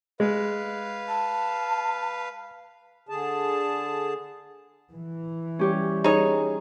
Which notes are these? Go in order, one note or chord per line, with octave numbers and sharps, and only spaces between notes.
G#3 B4 F5
A5
D3 G#4 A5
E3
G3 C#4 G4 C#5
D#4 G#4 C#5